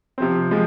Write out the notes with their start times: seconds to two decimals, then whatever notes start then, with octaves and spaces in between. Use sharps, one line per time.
0.18 C3 F3 C4
0.51 F3 G#3